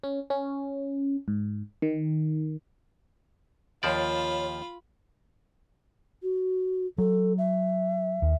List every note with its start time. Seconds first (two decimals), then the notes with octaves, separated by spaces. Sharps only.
0.04 C#4
0.30 C#4
1.28 G#2
1.82 D#3
3.83 D#2 F3 F4 C#5 D5 B5
6.23 F#4
6.98 F#3 A4
7.38 E5
8.22 D#2